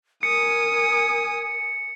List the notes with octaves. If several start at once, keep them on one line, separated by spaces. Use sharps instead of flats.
A#4 G#5 D#6 C#7